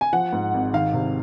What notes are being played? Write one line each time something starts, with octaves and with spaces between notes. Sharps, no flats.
G#5
F3 F#5
G#2
G#1
D#3 F5
C3